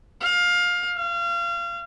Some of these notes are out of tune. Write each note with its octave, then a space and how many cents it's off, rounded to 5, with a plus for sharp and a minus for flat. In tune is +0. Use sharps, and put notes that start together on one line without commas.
F5 +20
F5 -30